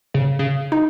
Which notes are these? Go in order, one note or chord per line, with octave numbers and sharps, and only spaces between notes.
C#3
C#3
D#4